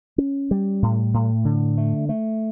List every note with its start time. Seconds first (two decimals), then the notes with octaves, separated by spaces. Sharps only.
0.18 C#4
0.51 G3
0.82 A2
1.14 A2
1.45 D3
1.78 A3
2.09 A3